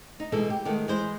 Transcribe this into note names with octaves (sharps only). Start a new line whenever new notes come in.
D#4
B2 E3 G#3 A4
G4
D#3 G#3 A3 B3
E3 G#3 C5